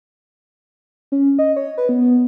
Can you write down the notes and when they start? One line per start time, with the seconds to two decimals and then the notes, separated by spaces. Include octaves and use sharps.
1.12 C#4
1.39 D#5
1.56 C#5
1.78 B4
1.89 B3